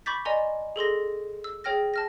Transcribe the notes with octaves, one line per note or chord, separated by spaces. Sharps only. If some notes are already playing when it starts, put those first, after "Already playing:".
B5 C#6 D6 G6 A6 B6
D5 D#5 G#5 A#5 C6
G#4 A4 C6 A#6
E6
G#4 C#5 G5 F6 A#6
A5 F6 A#6